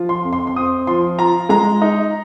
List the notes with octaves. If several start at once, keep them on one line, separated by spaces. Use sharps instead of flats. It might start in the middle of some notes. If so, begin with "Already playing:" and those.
Already playing: F3 F4
C6
F2
C6
C6
C4 D#6
F3 C6
F4 A#5
G#3 A#5
D#4